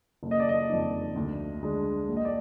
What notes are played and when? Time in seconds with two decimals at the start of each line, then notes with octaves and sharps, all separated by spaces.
0.23 F#1
0.31 D#5
0.40 D5
0.49 D#5
0.69 F2 D#3
1.16 D2
1.62 D3 G#3 D4
2.09 A#1
2.16 D#5
2.25 D5